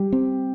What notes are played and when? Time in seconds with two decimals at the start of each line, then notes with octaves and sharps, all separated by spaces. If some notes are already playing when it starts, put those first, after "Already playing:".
Already playing: G3 G4
0.12 C4